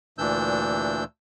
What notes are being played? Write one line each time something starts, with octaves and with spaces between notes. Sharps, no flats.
D2 A#2 E3 D4 E6 G6